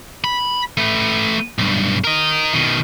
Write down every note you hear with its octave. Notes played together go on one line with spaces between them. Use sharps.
B5
A3 B4
B1 G2
A#4 D#5
B2 D#3